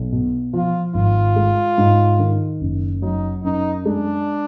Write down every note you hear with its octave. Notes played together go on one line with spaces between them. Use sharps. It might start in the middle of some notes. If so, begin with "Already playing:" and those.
Already playing: B1
B2
F3 F4
G#1 F4
G#3
G#2
D#3
F#1
F#3 D#4
F#2 D#4
G#3 D4